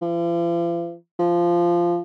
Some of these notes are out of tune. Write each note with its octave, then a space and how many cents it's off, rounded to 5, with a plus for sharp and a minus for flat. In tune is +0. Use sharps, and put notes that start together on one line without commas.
F3 -45
F3 -10